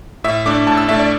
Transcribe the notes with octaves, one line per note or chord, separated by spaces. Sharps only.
A2 E5
A3 D4 D6
A2 A5
E6
A3 D4 E5
D5